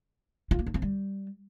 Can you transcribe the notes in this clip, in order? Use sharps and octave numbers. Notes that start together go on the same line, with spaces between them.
F4
A#3
D4
C4
G3